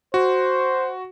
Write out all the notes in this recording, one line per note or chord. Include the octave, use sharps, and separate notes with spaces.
F#4 C5